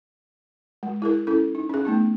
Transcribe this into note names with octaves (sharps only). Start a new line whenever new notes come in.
G#3
E4 G#4 A#4
C#4 E4 A4
D#4
C#4 G#4
A3 B3 D#4